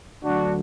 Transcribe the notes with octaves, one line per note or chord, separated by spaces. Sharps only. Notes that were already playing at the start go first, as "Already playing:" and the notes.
D2 D3 F#3 D4 F#4